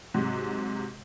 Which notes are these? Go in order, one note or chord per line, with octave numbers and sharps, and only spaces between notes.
G#2 C3 F#3